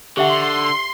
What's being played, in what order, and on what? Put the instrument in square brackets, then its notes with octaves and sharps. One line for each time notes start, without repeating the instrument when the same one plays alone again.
[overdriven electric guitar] D3 [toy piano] G4 E5 F#5 [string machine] C6